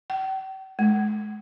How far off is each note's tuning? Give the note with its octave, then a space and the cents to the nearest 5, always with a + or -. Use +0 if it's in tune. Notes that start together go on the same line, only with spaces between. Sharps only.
G5 -40
G#3 +35